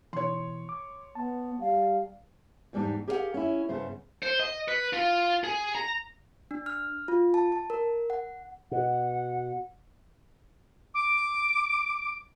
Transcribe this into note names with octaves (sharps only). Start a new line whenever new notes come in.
B2 E3 C#5 C6
D6
B3 A5
G3 F5
E2 G#2 G3 D4 D#4
G4 G#4 A#4 B4 F5 F#5
C#4 E4
G2 C#3 B3 C5
C5
D#5
B4
F4
G#4
A#5
D4
F6
F4
A5
A5
A#4
F#5
B2 F#5
D6